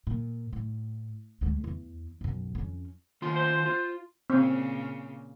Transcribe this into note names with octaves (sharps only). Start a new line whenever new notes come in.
A#2
A2
D2 G#3
E2
B1 F#2
F2 C#4
D#3 F4 C6
C5
F4
A#2 C#3 C4